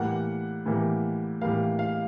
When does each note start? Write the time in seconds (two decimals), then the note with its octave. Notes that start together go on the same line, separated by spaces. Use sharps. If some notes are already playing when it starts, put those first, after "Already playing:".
Already playing: A2 E3 G3 A#3 F#5
0.66 A2 E3 G3 A#3
1.41 A2 E3 G3 A#3 F5
1.79 F5